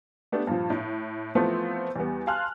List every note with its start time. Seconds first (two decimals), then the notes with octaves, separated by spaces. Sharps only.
0.32 A3 B3 D4 G4
0.47 G2 A#2 F3
0.70 A2
1.35 E3 F3 A3 B3 C4 F4
1.96 E2 G3 B3
2.27 F5 G#5 A5 C6 F6 F#6